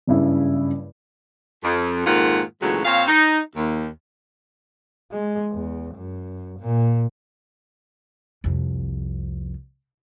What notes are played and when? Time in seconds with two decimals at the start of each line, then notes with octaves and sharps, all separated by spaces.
0.07 F#1 G2 C#3 E4
1.63 F2
2.06 F2 G#2 D#3 A#3 F4 F#5
2.62 D2 A#2 C#3 E3 F#3 G#3
2.85 A#2 C4 C#5 F5
3.08 D#4
3.56 D#2
5.12 G#3
5.51 E2
5.95 F#2
6.60 A#2
8.44 C2 F2